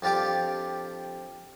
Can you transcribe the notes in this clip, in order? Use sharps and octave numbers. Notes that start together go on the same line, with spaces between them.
F2 D4 F4 G4 D6